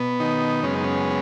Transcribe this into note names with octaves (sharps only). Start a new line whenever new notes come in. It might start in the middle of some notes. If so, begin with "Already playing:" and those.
Already playing: B2 B3
D#3 D#4
F#2 C#3 G#3 B3 C#4
D#4
C#4